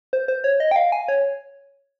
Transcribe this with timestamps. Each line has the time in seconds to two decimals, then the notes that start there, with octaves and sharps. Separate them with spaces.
0.13 C5
0.28 C5
0.44 C#5
0.60 D#5
0.71 G5
0.76 F5
0.92 G#5
1.08 C#5